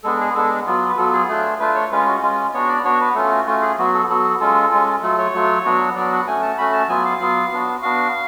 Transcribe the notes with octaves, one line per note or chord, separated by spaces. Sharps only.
G#3 B3 D4 A4
G#4
G#3 B3 D4 A4
F#3 B3 F4
B4
F#3 B3 F4 A4
G#4
A3 D4 F4
A3 D4 F4 B4
C#5
G#3 C#4 F4 B4
F#4
G#3 C#4 F4
B3 D4 F#4 C#5
D5
B3 D4 F#4 C#5
B4
A3 C#4 F4 A4
F#4
A3 C#4 F4 F#4
G#4
F#3 B3 F#4
A4
F#3 B3 F#4 A4
G#3 C#4 F4 A4
G#3 C#4 F4
F#3 A3 F4 A4
C#5
F#3 A3 F4
F#3 B3 D4 F#4
F#3 B3 D4 F#4 D5
F#5
A3 C#4 F#4 G#5
A5
A3 C#4 F#4 B5
A5
F#3 B3 F4 G#5
F5
F#3 B3 F4
B3 D4 F#4
B3 D4 F#4 F5